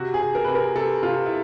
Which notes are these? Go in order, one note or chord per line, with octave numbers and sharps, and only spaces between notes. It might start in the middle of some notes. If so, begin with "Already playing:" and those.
Already playing: C3 F#4
G#4
C3
A#4
C3 B4
A#4
C3 A4
C3 F4
E4